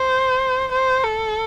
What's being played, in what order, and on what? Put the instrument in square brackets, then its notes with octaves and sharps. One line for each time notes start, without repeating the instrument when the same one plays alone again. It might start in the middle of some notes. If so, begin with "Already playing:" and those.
Already playing: [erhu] C5
C5
A4